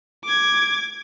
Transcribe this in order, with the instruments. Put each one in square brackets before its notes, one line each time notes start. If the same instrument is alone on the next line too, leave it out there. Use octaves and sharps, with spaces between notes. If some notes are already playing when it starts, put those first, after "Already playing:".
[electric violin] D6 G#6